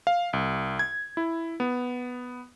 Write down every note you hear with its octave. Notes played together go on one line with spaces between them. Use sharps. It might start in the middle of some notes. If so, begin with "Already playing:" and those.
F5
C2
G#6
E4
B3